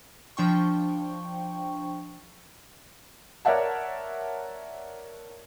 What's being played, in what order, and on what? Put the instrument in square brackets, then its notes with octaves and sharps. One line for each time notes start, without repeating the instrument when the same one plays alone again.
[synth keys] F3 D4 G5 C#6
[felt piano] A#4 C#5 D5 E5 F#5 A5